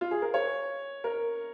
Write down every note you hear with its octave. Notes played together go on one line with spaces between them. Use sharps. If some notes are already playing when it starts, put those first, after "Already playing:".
F4
G#4
A#4
C#5
A#4